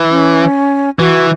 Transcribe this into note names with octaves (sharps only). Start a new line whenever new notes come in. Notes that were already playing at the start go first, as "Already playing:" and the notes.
Already playing: E3
C#4
E3 F#4